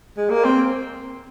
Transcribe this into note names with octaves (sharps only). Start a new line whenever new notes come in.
G#3
A#3
C4